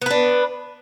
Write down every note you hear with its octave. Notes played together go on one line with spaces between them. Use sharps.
B3 D4 B4